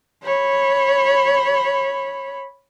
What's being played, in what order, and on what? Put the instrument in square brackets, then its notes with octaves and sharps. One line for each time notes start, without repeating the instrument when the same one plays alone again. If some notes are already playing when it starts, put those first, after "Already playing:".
[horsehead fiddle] C#5 B5